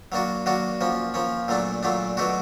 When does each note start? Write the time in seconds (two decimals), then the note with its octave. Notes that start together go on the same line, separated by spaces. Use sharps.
0.12 F#3 A#3 D4 F#4
0.46 F#3 A#3 D4 F#4
0.81 F3 A#3 C#4
1.14 F3 A#3 C#4
1.48 A#2 F#3 A3 D4
1.83 A#2 F#3 A3 D4
2.17 B2 F#3 A3 D4 F#4